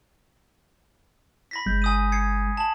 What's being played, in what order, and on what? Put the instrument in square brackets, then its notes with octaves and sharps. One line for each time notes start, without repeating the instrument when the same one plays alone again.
[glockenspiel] B5 A#6 B6
[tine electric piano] G1 G#3 G6
[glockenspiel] G#5 D#6 D#7
G#6 C7 C#7
A5 F#7